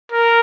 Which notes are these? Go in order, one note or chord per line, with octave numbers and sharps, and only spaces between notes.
A#4